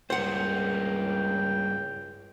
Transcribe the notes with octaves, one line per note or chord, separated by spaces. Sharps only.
C#2 G2 A#3 C5 F#5 G5